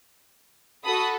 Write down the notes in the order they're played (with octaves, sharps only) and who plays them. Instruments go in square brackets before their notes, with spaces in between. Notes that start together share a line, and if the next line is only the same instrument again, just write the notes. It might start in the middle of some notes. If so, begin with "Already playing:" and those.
[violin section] F#4 A4 B5 D#6